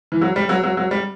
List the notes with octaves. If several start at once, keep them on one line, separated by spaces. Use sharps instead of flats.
E3
F#3
G3
F#3
F#3
F#3
G3